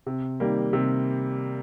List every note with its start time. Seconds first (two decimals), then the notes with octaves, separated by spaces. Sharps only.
0.06 C3
0.40 D#3 G3 A#3
0.73 C3